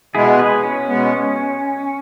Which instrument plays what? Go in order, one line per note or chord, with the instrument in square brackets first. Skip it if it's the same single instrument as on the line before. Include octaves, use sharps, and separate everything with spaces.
[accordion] B2 G#3 B3 [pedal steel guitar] E4 G#4
[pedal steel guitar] G#4 B4
C#4
[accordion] B2 G#3 B3